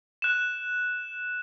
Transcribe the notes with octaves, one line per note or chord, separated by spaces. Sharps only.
F#6 E7